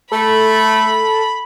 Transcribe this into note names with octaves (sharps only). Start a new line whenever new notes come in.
A3 A4 B5